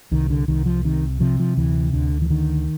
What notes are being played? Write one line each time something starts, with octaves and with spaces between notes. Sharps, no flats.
C2 D#3
D3
C2 D#3
F3
C3 D#3
C3 F3
F3
D2 E3
D2 D3
E3
D3 D#3